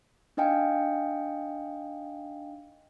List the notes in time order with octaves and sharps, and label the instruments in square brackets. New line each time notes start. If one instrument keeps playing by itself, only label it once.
[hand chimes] D4 D#4 D#5 F5 G5 G#5